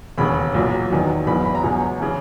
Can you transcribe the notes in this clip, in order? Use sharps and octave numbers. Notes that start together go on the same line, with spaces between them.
E1 D#2 C#3 B5
B1 A#2 F#3
E2 D#3 F#3
F#1 E2 B2 F#3 B5
B5
A#5
C#2 B2 F#3 G#5
C#3 E3